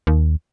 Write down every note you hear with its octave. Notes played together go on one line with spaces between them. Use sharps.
D#2